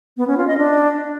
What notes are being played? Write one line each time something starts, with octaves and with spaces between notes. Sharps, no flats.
B3
C#4
F4
D#5
D4